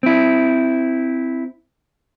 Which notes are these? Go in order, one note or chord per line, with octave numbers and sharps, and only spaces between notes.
C4 E4